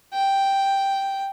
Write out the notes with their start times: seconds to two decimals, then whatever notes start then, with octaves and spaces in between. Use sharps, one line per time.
0.14 G5